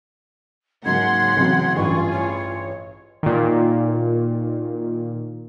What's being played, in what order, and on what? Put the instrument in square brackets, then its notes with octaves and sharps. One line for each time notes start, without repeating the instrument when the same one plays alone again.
[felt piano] G#2 F#3 A#3 [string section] C#3 F#5 C6 [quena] G#6
[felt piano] A1 C3 F#3
[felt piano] A1 G2 [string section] F4 G#4 [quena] C#6
[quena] C#5
[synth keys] A#2 D#3